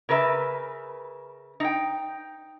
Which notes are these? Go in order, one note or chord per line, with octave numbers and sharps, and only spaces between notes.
C#3 A#4 B4 E5
D#4 G5